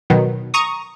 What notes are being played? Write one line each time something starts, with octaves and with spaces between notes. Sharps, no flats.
B2 D#3 F#3
A#5 C#6 D#6